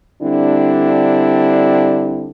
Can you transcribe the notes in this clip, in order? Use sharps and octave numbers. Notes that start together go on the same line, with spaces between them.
D3 G3 C4 D4 E4